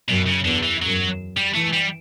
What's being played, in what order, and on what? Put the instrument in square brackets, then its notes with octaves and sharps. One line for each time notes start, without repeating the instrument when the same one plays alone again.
[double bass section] F#2 [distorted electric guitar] B2
[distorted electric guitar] C#3
[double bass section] E2 [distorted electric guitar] D3
[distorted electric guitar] E3
[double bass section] F#2 [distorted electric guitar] F#3
[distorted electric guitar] G3
[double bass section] E3 [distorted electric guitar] A3
[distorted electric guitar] G3